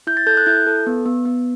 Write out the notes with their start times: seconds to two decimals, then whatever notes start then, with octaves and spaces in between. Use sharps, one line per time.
0.07 E4 G6
0.17 A6
0.27 A4 G6
0.37 F#6
0.46 E4 G6
0.66 A4
0.86 B3
1.06 B3
1.25 B3